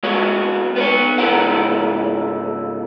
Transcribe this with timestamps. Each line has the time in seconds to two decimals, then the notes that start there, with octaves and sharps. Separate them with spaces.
0.03 G#3 B3 F#4 C#5
0.76 B3 C5 C#5
1.18 C#2 G#2 E4 G4 A#4 F#5